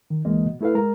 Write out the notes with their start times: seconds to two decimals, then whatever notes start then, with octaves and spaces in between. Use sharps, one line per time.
0.10 D#3
0.25 D2 E3 G#3 A#3 D#5
0.46 B2
0.61 A3 E4 A4 B4 F5
0.75 G#3 A#4 A#5